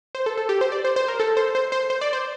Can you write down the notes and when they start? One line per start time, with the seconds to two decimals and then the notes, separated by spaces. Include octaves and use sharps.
0.15 C5
0.26 A4
0.37 A4
0.49 G4
0.61 C5
0.72 D5
0.85 C5
0.96 C5
1.08 A#4
1.20 A4
1.37 C5
1.55 C5
1.72 C5
1.90 C5
2.01 D5
2.13 C5